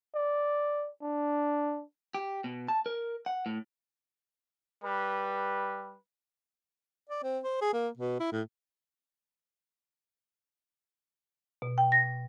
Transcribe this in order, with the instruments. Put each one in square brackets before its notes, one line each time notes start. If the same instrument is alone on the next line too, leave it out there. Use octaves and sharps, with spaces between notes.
[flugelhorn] D5
D4
[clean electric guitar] G4
B2
A5
A#4
F#5
A2
[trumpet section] G3 B4
[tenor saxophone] D5
C4
C5
G#4
A#3
B2
E4
A2
[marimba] B2
G5
A#6